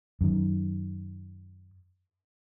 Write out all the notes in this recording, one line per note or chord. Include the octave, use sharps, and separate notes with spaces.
F#2 D#3